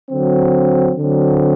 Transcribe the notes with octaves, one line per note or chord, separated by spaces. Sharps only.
D3 F#3 C4
D3 F#3 C4